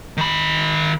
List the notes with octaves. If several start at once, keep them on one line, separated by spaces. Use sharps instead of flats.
D#3 B5